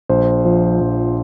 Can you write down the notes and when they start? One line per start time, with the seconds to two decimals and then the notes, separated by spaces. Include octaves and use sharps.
0.09 A#1 C5
0.45 F3
0.81 A#1